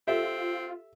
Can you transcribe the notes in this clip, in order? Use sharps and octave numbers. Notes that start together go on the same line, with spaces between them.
C4 F4 G4 A4 E5